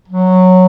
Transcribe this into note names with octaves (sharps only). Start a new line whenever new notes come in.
F#3